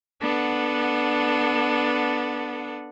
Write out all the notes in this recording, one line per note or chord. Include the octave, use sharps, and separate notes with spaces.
B3 D4 A4 F#5